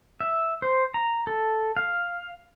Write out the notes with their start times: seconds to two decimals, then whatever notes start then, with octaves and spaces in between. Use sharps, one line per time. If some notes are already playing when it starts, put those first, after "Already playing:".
0.20 E5
0.62 C5
0.94 A#5
1.27 A4
1.77 F5